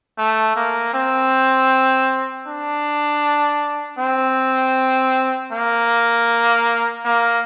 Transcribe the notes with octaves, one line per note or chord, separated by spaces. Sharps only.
A3
A#3
C4
D4
C4
A#3
A#3